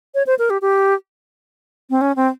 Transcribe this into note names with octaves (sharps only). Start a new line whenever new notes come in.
C#5
C5
A#4
G4
G4
C4
C#4
C4